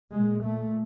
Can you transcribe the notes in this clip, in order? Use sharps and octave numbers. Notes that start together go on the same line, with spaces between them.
A#2 G#3
A3